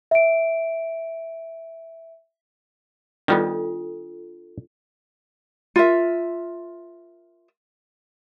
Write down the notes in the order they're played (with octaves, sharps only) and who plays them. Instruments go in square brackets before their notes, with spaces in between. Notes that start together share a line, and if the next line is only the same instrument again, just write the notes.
[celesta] E5 D7
[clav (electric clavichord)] D#3 G3 B3 [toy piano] D4 F4 A4
[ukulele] F4 A#4 E5